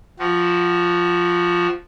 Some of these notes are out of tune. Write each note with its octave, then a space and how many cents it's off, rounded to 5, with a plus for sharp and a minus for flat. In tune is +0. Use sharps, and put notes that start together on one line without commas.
F3 +0 F#4 +20